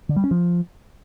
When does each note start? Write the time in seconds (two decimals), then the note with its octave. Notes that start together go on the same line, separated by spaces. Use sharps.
0.09 D3
0.16 G3
0.24 C#4
0.31 F3